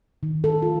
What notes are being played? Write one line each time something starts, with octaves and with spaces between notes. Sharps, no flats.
D#3
A4
F4